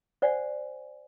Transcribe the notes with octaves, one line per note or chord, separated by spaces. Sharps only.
C5 D5 F#5 G#5